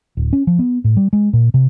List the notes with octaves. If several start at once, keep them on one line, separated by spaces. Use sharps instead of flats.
D1
C#4
F3
B3
A2
G3
G#3
A#2
C3